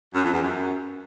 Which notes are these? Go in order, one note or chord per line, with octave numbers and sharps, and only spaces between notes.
F#2
F2
E2
F#2